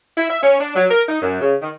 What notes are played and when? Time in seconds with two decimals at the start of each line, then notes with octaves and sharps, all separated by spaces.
0.17 E4
0.29 E5
0.43 C#4
0.60 D4
0.75 F#3
0.90 A#4
1.08 D#4
1.22 F#2
1.40 C#3
1.62 D#3